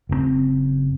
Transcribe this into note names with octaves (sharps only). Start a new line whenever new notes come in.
F#1 C3 C4